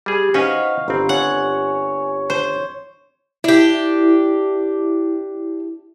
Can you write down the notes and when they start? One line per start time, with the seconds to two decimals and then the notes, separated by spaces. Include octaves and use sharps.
0.06 G3 G4 G#4
0.34 C#4 D#4 F#4 B4 C5 D#5 F5 F#5
0.88 G1 C4 F5 A#5 B5
1.09 C#5 F#5 G#5
2.30 C5
3.44 D4 E4 G4